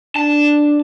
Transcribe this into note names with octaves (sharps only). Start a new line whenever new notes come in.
D4 A5